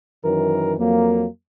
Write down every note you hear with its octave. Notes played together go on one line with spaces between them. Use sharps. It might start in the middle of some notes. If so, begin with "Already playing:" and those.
F#2 D#3 E3 F#3 A#4
F2 F#3 A#3